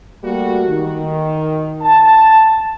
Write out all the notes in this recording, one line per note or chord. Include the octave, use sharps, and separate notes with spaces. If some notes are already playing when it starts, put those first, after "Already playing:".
G3 A3 A#3 F#4
D#3
A5